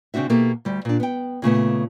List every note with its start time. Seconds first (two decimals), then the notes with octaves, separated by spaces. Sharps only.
0.14 C#3 C4 D4 F#4 E5
0.29 B2 A#3 E4 G4 A4
0.65 D2 G3
0.85 A#2 D4
1.00 B3 G5
1.42 A#2 C#3 A3 B3